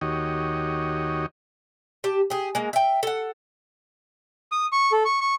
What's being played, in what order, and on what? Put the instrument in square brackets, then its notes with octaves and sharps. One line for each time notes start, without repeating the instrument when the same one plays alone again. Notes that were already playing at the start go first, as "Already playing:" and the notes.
[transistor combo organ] D#2 D#3 F#4 G4 C#5 D#5
[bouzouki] G4 A5
G4 G#4
G#3 A#3
E5 G5
A4 F#5
[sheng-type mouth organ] D#6
C#6
A4
C#6
C#6